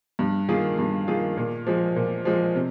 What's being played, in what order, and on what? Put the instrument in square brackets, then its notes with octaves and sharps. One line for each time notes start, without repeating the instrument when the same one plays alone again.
[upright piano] G2
D#3 A#3 F4 G#4
G2
D#3 A#3 F4 G#4
A#2
F3 G#3
A#2
F3 G#3
C3